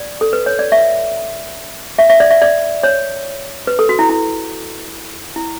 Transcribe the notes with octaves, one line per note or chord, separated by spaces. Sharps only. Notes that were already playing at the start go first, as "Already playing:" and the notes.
Already playing: D5
A4
B4
C#5
D5
E5
E5
E5
D5
E5
D5
C#5
B4
A4
F#4
E4
E4
E4